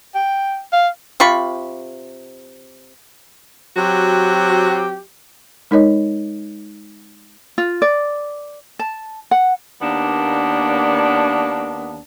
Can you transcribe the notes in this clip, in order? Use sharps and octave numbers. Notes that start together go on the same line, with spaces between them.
G5
F5
C3 F4 B5 C#6
F#3 C4 F#4 G4
G#3 D#4 A#4 C#5 D#5
F4
D5
A5
F#5
D#2 A#3 B3 D4